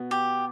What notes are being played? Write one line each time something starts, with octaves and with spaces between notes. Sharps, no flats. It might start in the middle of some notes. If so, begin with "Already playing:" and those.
Already playing: B2 B3
G4